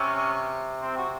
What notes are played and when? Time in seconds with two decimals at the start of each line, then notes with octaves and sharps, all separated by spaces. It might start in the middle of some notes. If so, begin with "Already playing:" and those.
Already playing: C3 C#4
0.82 C4
0.97 F#4